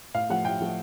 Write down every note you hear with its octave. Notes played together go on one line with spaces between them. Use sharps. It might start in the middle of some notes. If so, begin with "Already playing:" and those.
A2 F5
F3 A3 F#5
A2 G5
F3 A3